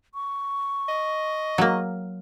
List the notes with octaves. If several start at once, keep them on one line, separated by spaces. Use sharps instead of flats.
C#6
D#5
F#3 A#3